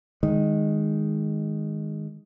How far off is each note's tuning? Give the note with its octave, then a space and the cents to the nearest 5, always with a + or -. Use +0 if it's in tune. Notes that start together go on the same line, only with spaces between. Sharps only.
D#3 +0 G#3 +0